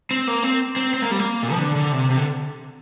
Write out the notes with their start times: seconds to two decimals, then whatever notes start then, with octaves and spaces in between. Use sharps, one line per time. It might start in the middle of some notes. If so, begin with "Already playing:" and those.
0.11 C4
0.27 A#3
0.43 C4
0.76 C4
0.94 C4
1.02 A#3
1.11 G3
1.20 A#3
1.42 A#2
1.52 F3
1.59 D3
1.76 D3
1.92 C3
2.10 C3
2.18 D3